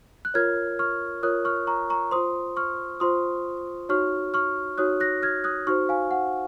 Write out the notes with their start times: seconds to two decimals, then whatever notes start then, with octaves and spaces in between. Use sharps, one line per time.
0.25 F#6
0.34 F4 A#4 C#5 F6 G#6
0.79 C#6 F6
1.23 F4 A#4 C#5 D#6 F#6
1.45 C#6 F6
1.67 A#5 C#6
1.90 A#5 C#6
2.11 F4 C5 C6 D#6
2.57 C#6 F6
3.00 F4 C5 C6 D#6
3.89 D#4 F#4 C#5 C#6 F6
4.34 C#6 F6
4.78 D#4 F#4 C#5 D#6 F#6
5.00 F#6 A#6
5.22 F6 G#6
5.44 D#6 F#6
5.67 D#4 F#4 C5 C#6 F6
5.89 F5 G#5
6.11 F#5